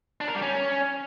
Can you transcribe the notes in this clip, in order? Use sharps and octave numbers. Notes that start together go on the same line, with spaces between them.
D4
A#4
G3
C#4